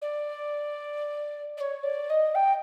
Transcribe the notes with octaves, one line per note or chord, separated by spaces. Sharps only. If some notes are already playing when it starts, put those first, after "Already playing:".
D5
D5
C#5
D5
D#5
G5